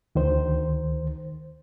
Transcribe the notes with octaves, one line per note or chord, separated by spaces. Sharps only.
D2 D#3 C5